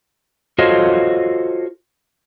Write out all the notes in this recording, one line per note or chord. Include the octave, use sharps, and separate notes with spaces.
F4 F#4 A4 C5 C#5 D#5